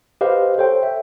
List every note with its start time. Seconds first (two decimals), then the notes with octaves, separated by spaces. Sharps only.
0.21 G4 B4 C5 D#5 F5
0.58 A4 C5 C#5 G5
0.83 E5